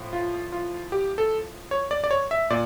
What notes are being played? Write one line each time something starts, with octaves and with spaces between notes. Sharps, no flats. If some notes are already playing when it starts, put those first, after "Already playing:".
Already playing: A2 F3
F4
F4
G4
A4
C#5
D5
D5
C#5
E5
A#2 D5